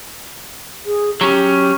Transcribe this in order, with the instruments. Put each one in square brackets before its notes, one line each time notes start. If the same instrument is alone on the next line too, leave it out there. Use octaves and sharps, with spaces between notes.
[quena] G#4
[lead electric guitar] F#3 C#4 [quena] G4